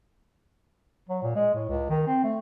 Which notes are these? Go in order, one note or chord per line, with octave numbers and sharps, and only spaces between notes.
F#3
A#2
G#3
A2
C#2
D#3
C4
A3